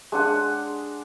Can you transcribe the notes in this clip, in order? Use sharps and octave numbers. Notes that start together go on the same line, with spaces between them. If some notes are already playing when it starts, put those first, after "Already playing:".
G#3 D4 F#5